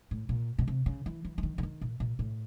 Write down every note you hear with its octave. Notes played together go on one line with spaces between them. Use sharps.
A2
A#2
B2
C3
C#3
E3
E3
E3
D#3
D3
D#3
A#2
A#2
A2